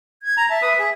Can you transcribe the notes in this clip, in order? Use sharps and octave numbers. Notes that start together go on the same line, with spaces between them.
G#6
A#5
E5 A5
B4 D#6
G#4